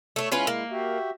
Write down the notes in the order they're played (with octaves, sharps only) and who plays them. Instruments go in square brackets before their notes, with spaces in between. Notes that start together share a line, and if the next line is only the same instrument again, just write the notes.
[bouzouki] A3 C#5
[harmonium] G#3 E4 [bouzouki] C#4 F4 B4
[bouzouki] A#3
[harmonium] F#4 G4 E5